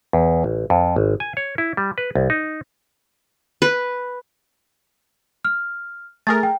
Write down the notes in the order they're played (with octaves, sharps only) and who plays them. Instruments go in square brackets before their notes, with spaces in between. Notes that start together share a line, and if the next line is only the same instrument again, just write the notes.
[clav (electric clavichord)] E2
A1
F2
G#1
G#5
C#5
E4
G3
B4
C2
D#4
[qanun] B4
[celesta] F6
[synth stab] A3 G#4 A#4 [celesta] A6
[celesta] G5